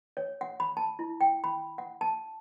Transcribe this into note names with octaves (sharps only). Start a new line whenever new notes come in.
C#5
F#5
B5
A5
E4
G5
B5
F#5
A5